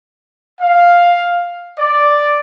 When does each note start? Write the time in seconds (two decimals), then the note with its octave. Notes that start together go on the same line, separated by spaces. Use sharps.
0.62 F5
1.79 D5